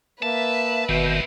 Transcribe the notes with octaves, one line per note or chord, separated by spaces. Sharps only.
A#3 B4 E5 A5
G1 G#2 B2 D#3 C4